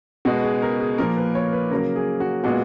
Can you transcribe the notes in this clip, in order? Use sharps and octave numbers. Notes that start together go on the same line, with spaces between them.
B2 G#3 B3 F#4
G#4
A#4
G#4
A#2 F3 A#3 A#4
B4
C#5
B4
C#3 F#3 A#3 A#4
G#4
F#4
A#2 G#3 B3 F#4